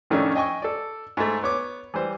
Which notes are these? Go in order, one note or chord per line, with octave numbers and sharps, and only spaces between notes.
F2 A2 D#3 A3 C#4 D4
D#5 G5 G#5 C#6
A4 D5
G#2 A3
B3 C#5 D6
E3 G3 C5